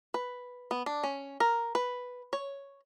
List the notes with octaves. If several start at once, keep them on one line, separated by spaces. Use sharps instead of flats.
B4
B3
D4
C#4
A#4
B4
C#5